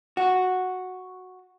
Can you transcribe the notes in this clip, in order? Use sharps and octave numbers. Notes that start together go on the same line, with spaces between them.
F#4